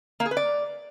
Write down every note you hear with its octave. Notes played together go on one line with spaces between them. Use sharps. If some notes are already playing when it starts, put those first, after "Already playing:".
A#3
G#4
B4
D5